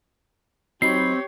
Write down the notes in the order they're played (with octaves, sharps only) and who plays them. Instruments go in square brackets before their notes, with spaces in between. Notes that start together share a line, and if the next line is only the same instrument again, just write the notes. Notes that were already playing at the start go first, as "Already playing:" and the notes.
[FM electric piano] F#3 D#4 B5 [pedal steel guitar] C4 [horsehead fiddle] G4 C#5 [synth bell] C7